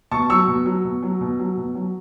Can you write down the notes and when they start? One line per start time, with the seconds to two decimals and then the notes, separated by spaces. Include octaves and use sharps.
0.11 B2 A5 C#6
0.30 F#3 C#6 E6
0.48 B2
0.66 F#3
0.84 B2
1.03 F#3
1.21 B2
1.39 F#3
1.57 B2
1.75 F#3